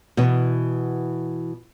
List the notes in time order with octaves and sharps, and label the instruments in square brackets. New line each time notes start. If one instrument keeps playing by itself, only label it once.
[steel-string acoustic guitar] B2 E3